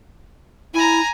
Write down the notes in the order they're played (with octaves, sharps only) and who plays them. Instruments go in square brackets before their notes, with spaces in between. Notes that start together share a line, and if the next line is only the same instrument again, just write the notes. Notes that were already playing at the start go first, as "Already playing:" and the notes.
[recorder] E4 [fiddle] G#5 A#5